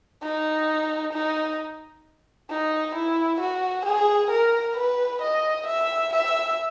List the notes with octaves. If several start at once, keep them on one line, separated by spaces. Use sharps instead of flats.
D#4
D#4
D#4
E4
F#4
G#4
A#4
B4
D#5
E5
E5